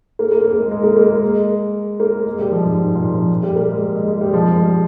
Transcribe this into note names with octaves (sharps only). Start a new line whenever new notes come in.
A#3
A#3
A#3
G#3
G#3
A#3
A#3
G#3
A#3
G#3
G3
F3
G#2
G#2
A#2
F3
G3
A#3
G#3
G#3
G#3
G3
F3
G#3
G3